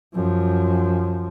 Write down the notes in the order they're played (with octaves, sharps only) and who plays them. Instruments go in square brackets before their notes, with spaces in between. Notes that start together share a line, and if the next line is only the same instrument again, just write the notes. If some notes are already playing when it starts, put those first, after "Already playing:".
[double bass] F#2 F3